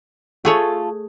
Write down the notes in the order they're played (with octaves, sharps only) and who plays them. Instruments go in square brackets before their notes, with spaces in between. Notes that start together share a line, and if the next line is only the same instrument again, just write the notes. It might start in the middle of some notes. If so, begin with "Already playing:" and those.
[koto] A3 G#4 C#5 [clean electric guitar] F4 A4